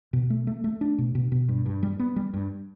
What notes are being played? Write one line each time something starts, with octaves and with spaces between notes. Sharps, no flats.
B2
A3
A3
A3
D4
B2
B2
B2
G2
G2
G3
B3
G3
G2